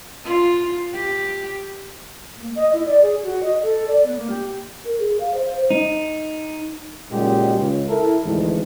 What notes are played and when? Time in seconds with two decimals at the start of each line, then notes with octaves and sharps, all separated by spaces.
0.24 F4
0.93 G4
2.38 A#3
2.55 D#5
2.73 E4
2.86 D5
3.02 G#4
3.23 F#4
3.43 D#5
3.62 A4
3.88 D5
4.04 B3
4.16 A#3
4.30 G4
4.85 A#4
4.99 G#4
5.20 F5
5.34 C5
5.70 D#4
7.11 A#2 C#3 F#3 G#3 D#4 G4
7.56 C#2
7.88 E4 A4 A#4
8.24 D2 G#2 C3 D#3 E3